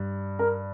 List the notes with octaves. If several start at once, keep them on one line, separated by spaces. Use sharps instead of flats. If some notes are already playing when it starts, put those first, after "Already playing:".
Already playing: G2
A#4